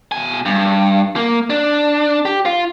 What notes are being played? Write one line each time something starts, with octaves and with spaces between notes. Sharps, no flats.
B2 G#5
G2
A#3
D4
G4
F4